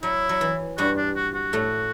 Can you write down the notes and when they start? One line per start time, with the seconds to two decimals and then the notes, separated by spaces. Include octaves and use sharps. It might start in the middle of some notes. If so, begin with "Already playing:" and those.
0.03 F#3 E4
0.29 F#3
0.41 E3
0.78 G2 G3 F#4
0.97 D4
1.16 F#4
1.34 F#4
1.53 A2 A3